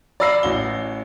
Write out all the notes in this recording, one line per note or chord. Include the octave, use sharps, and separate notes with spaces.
D5 F5 B5 E6 A#6 C7
A1 F#4 G7